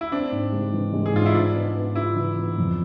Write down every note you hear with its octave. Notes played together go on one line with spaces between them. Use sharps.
E4
C4 D4
G#2
G#3
E3
G#3
G#4
G#2 F4
E4
D4 F4
B3
B3
E4 F4
E3
B3
F2